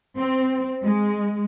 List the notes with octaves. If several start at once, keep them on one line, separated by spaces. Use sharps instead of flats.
C4
G#3